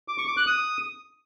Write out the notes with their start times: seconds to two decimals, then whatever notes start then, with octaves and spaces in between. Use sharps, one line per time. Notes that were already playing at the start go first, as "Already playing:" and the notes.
0.08 D6
0.18 C#6
0.27 D6
0.37 F#6
0.47 D#6